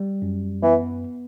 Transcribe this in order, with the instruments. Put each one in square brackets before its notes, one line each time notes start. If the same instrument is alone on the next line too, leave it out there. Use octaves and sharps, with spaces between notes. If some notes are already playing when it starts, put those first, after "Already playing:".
Already playing: [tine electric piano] G3
F#2
[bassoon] E3 [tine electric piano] B3